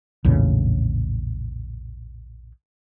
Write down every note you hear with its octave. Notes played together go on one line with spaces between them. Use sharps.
A#1 E2 A2 C#3